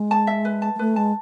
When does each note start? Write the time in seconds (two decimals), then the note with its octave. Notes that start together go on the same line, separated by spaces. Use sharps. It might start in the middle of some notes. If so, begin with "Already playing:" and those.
Already playing: G#3
0.11 A5
0.27 E5
0.45 B4
0.62 A5
0.75 G#3
0.79 A3 B4
0.96 G#3 A5